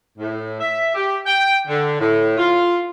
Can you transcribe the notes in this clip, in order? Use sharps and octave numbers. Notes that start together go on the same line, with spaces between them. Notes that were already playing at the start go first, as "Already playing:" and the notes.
A2
E5
G4
G5
D3
A2
F4